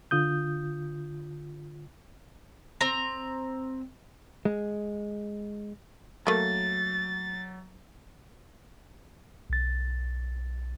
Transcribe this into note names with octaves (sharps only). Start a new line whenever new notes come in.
D3 F4 D#6 G6
C4 A#5
G#3
F#3 A3 A#3 A6
B1 A6